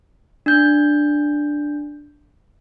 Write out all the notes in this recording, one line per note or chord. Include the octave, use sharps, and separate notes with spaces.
D4 G6